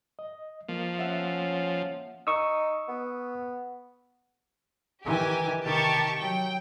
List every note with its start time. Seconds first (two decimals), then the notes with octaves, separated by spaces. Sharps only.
0.19 D#5
0.68 F3 A#3
0.99 C#4 E5 F#5
2.27 D#4 C#6 D#6 E6
2.88 B3
5.05 D#3 E3 G4 G#5
5.63 C3 D#3 G4 A5 C#6
6.19 F#3 G5